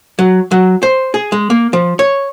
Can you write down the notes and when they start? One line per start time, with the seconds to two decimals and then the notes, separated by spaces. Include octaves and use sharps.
0.19 F#3
0.51 F#3
0.83 C5
1.14 G#4
1.32 G#3
1.50 A#3
1.73 F3
1.99 C#5